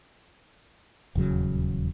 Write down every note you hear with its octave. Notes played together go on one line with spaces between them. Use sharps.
D#1 E2 C#3 F#3